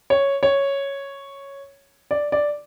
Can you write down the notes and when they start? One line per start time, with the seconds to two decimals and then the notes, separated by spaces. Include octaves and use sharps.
0.10 C#5
0.43 C#5
2.11 D5
2.32 D5